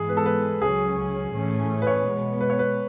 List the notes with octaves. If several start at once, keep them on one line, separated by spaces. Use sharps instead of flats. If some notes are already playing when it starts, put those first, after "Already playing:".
Already playing: G#2 E3 G#3 B3 G#4
B4
A4
B4
C#2 C#3 F#3 C#4 G#4
A2 E3 A3 C#4
B4
C#5
B2 G#3 B3
B4
C#5
B4